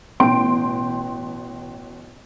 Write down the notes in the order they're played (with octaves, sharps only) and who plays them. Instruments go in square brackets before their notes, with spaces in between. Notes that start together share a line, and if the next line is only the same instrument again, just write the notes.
[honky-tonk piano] A1 B2 G5 C6 D7